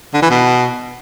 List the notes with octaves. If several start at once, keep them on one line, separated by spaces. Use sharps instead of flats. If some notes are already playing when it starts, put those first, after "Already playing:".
D3
E3
B2